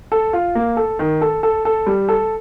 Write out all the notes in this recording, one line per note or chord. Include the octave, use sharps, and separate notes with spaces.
A4
F4
A#3
A4
D#3
A4
A4
A4
G3
A4